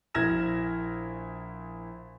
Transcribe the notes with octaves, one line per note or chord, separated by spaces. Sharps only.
A#1 E4 F6 G#6 A#6 E7